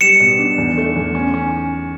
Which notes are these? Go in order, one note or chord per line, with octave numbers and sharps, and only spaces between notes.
G3 C#7 E7
B2
D4
E2
A3
E2
C#4
C#4